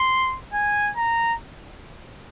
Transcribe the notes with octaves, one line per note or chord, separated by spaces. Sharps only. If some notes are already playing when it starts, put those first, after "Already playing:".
Already playing: C6
G#5
A#5